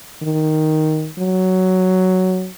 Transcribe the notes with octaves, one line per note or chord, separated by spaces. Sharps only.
D#3
F#3